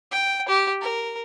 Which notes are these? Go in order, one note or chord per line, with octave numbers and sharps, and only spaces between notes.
G5
G4
A#4